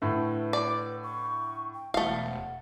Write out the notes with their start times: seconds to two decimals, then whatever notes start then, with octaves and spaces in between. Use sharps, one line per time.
0.02 A2 D3 A3 B4
0.53 D5
1.03 C#6
1.75 G5
1.94 E1 A3 F5 F#5